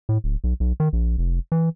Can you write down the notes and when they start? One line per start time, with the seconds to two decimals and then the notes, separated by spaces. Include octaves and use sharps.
0.09 A2
0.24 D1
0.44 B1
0.60 B1
0.80 D#3
0.93 A#1
1.18 F1
1.52 E3